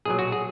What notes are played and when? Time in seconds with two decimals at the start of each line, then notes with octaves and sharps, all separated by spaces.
0.05 B1 A#2 F#3 G#4
0.19 F#4
0.32 G#4